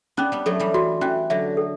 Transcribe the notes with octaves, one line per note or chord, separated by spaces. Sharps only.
B3 C#4 D4
G3 B3
F#3 A3 A4
E3 G3
E3 F#4
E3 C#4
D3 F#3 E5
A4